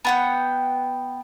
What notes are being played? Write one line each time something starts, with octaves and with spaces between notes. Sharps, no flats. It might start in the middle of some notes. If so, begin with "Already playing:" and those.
B3 F#5 G5